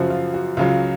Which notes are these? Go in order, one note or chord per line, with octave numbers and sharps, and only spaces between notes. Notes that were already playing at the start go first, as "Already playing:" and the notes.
Already playing: F#2 C#3 F3 F#4
F4
F#4
C#2 C#3 F#3 F4